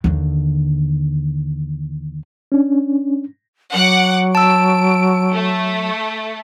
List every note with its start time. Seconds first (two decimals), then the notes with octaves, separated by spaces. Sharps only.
0.04 D#2 D3
2.52 C#4 D4
3.74 F#3 F#5 D6
4.35 A5 E6 D7
5.32 A3